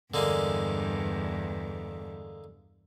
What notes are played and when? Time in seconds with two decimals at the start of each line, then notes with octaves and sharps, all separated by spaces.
0.14 E2 G2 D3 G#3 A#3